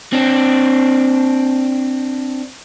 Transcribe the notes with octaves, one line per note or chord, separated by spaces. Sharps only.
C4 D4